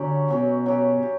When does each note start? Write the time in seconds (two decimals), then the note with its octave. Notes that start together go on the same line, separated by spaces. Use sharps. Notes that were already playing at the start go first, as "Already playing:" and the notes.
Already playing: D3 F#3 C#4 G4
0.30 B2 F#3 C#4 G4
0.66 F#3 C#4 G4
1.03 G4